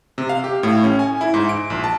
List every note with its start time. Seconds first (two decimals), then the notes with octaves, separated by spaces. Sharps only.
0.18 C3
0.29 F5
0.44 G4
0.63 A2
0.84 C#4
0.99 G#5
1.21 E4
1.34 G#2
1.49 D7
1.70 A#1
1.84 A5